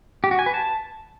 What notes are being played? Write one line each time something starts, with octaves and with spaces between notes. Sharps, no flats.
G4
F#4
G#5
B4
A5